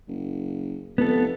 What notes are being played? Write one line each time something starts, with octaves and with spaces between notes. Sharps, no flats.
F#1
F1 B3 A4